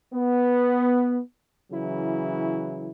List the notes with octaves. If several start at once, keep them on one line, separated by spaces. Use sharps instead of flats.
B3
C#3 E3 F#3 E4